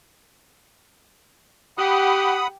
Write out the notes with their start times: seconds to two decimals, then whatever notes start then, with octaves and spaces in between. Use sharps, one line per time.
1.78 G4 F#5 B5 D#6